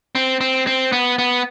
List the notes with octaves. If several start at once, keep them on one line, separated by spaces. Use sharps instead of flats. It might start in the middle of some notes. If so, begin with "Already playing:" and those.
C4
C4
C4
B3
B3